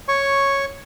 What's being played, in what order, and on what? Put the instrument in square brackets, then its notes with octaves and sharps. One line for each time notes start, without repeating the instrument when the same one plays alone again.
[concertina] C#5 C#6